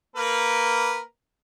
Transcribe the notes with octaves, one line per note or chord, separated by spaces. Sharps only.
A#3 A#4 B4